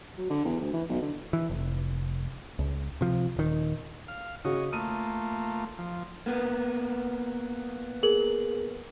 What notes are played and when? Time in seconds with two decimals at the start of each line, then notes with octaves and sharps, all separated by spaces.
0.17 F#3
0.30 D3
0.45 E2
0.61 D2
0.73 E3
0.89 B1
1.01 D3
1.33 E3
1.50 F1
2.59 C#2
3.01 C3 F3
3.36 D#1 D#3
4.08 F5
4.45 C#3 F#4 C#5 D#5
4.73 A3 A#3 F4 D#6 D#7
5.78 F3
6.26 A#3 B3
8.03 G#4 A#4 F#7